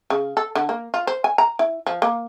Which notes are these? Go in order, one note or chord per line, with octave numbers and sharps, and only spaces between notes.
C#3
A4
D3
A#3
F4
C5
G#5
A#5
E4
F3
A#3